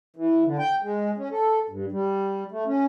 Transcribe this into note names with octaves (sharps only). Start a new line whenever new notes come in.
E3
D3
G5
G#3
C#4
A4
G2
G3
A3
C#4